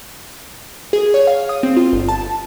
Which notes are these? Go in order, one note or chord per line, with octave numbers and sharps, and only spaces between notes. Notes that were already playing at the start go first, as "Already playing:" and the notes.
G#4
C#5
F5
D#6
C4
F4
G1
A5